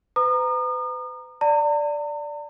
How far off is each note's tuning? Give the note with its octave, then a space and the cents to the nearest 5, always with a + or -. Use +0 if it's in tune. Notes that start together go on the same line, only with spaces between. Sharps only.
B4 +40 A#5 +0 D#6 -40
D5 -5 A#5 -45